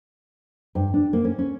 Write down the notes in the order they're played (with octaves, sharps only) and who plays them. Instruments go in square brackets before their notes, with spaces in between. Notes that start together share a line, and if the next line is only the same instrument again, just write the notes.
[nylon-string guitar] G2
D4
A#3
C#4
C#4